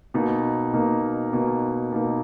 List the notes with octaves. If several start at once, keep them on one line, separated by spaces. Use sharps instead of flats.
B2 A#3 D#4
B2 A#3 D#4
B2 A#3 D#4
B2 A#3 D#4